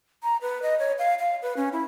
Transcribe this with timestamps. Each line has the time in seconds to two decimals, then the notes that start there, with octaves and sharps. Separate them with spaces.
0.23 A#5
0.41 B4
0.62 D#5
0.79 C#5
0.99 F5
1.19 F5
1.42 B4
1.57 C#4
1.72 E4